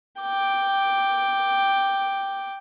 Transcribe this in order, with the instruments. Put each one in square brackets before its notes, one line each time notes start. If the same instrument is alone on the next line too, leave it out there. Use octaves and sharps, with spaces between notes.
[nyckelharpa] G5 D6